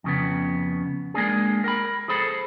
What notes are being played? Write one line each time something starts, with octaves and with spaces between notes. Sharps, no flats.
F2 C#3 B3
G#3 A#3 D4 G#4
A#4 G5 B5
G#4 A4 C5 B5